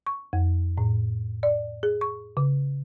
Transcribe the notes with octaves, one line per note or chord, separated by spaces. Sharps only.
C#6
F2
A2
D5
G#4
C#6
C#3